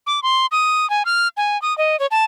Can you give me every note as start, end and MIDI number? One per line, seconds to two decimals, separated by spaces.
0.07 0.20 86
0.23 0.46 84
0.52 0.89 87
0.90 1.03 80
1.05 1.28 89
1.37 1.60 80
1.62 1.76 87
1.78 1.99 75
2.00 2.07 73
2.11 2.25 81